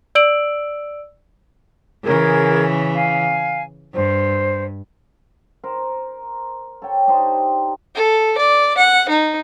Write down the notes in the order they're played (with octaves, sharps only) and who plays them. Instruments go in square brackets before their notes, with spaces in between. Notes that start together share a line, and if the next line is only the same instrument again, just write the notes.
[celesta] D5 E6 D7 F#7
[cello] C#3 E3 [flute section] G#4 A#4 G#6
[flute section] F5 G#5
[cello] G2 [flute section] C5
[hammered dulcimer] A#4 C5
A4 C#5 G5
D4 D#4 G4 C5
[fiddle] A4
D5
F#5
D#4